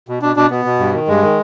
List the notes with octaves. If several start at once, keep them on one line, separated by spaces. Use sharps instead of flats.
B2
B2 D4
B2 D4
B2 B3
B2
G2
D#3
G2 G#3
D#3